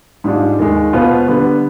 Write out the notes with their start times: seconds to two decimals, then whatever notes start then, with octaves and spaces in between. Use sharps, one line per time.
0.24 G#2 G3 D4 F4
0.59 D#2 D#3 G#3
0.93 B2 B3 F4 C5
1.28 D3 G3 B3